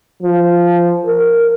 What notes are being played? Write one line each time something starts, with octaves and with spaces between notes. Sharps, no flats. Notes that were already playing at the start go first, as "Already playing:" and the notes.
F3
A#4